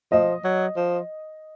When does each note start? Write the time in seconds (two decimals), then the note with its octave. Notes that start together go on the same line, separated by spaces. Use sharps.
0.12 F3 D#5
0.44 F#3
0.77 F3